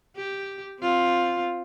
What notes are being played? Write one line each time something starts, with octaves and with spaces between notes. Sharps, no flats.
G4
C4 F4